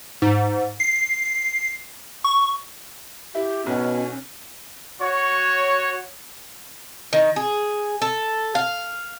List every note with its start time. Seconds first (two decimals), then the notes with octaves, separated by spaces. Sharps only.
0.22 G#2
0.80 C7
2.24 C#6
3.35 E4 G4
3.66 B1 B2 C#4
5.01 F#4 C#5
7.13 D#3
7.36 G#4
8.02 A4
8.55 F5